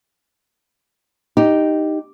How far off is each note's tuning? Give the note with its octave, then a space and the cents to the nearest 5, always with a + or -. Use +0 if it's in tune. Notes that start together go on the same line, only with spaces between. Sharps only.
D#4 +0 G4 +0